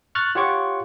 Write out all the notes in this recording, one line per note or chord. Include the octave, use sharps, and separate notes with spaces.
C#6 F6 F#6 A6
F4 G4 C#5 F#5 C#6 D6